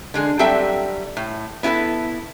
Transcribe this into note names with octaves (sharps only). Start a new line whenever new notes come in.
D3 G#3 G#4
F#3 G3 C4 A4 E5 G5
A2
B3 E4 G4 A4 B4